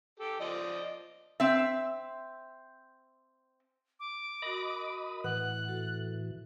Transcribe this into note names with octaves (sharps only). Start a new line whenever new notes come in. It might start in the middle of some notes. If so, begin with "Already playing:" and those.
G4 A4
F3 D5 D#5
C4 E5
D6
F#4 A#4 D#5 B5 D#6
A2 E3 F#5 F#6
F#4 A4